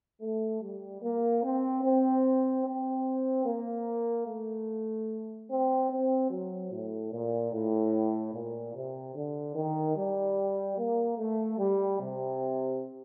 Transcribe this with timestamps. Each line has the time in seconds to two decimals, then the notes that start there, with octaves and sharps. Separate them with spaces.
0.21 A3
0.61 G3
1.02 A#3
1.43 C4
1.84 C4
2.65 C4
3.46 A#3
4.27 A3
5.49 C4
5.89 C4
6.30 F#3
6.72 A2
7.12 A#2
7.52 A2
8.34 A#2
8.75 C3
9.15 D3
9.55 D#3
9.96 G3
10.78 A#3
11.18 A3
11.58 G3
12.00 C3